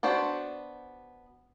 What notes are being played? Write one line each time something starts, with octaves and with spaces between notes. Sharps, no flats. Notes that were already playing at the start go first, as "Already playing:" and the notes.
B3 D4 F#4 C5